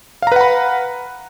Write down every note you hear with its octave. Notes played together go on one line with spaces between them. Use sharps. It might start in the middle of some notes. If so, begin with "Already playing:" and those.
B4 F5 F#5 A#5 B5